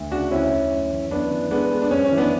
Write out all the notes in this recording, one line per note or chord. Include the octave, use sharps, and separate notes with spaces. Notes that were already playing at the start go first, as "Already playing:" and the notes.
Already playing: D2
C#3 D4 F#4
D2 C#4 E4
D2
F#2
E3
F#2 B3 D4
E3
G#3 B3 D4
G#3
D4
F#2 C#4
C#4
E3
B3 D4